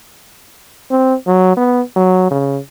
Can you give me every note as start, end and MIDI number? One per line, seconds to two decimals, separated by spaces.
0.91 1.14 60
1.27 1.57 54
1.57 1.81 59
1.96 2.31 54
2.31 2.59 49